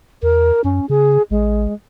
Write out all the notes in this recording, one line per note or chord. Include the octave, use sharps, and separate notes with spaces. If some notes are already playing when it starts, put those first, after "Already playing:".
E2 A#4
F#2 C#4
C#3 G#4
A1 G#3